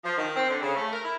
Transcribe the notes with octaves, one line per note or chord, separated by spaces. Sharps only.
F3
D#3
C4
D3
C#3
A3
A#4
E4